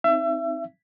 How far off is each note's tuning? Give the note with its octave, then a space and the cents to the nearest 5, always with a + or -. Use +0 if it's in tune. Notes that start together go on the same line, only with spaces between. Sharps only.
C4 +0 D#4 +10 E5 +30